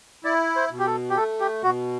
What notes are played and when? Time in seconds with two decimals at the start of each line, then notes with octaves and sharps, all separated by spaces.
0.24 E4 D5
0.56 C5
0.71 B2
0.79 G4
0.87 A4
1.10 G4
1.17 A3 A4
1.40 G4
1.63 B2 F#4